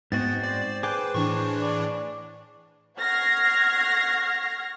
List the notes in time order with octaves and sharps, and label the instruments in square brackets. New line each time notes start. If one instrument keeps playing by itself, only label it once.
[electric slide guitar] G#2 C4 F#4 [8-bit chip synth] B3 [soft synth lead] A6
[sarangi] C5 [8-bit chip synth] D5
[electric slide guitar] G#4 G5 [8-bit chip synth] B4 [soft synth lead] D6
[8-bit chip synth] A2 E3 D4 [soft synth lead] C#6
[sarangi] D5
[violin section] F#5 C#6 F6 G#6 A#6 C7